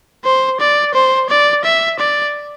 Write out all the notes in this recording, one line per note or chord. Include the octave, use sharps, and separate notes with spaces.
C5
D5
C5
D5
E5
D5